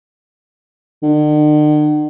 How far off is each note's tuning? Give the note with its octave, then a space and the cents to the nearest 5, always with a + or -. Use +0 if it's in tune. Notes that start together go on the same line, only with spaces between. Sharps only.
D3 +45